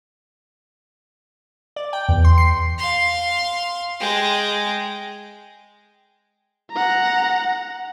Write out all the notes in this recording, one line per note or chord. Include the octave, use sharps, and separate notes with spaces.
D5
G5
E2
C6
C7
F5 C6
G#3 G5
F#5 A#5